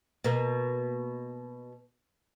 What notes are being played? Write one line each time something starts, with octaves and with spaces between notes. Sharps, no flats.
B2 A#3